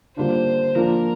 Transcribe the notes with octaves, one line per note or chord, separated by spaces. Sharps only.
D3 G3 A#3 D4 F4 C5
F3 A#3 D4 A#4